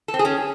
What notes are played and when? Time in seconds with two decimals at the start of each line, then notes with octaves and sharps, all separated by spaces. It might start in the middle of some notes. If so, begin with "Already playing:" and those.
0.08 A4
0.14 C4
0.19 G#4
0.25 C#4